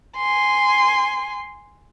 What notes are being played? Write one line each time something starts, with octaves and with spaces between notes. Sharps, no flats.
G#5 C6